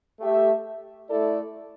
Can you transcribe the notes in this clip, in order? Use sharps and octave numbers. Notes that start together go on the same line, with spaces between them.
A3 G4 E5
A3 E4 A4 D5